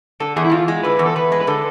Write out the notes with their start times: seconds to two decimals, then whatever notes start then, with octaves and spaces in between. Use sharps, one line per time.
0.20 D3 A4
0.36 E2 G#4
0.45 E4
0.52 E2 F4
0.68 G#3
0.83 D3 B4
0.99 E2
1.06 A4
1.16 E2 B4
1.32 G#3
1.41 B4
1.47 D3 A4